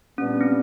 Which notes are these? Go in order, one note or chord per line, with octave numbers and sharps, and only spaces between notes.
A#2 G3 B3 C#4 D4
C4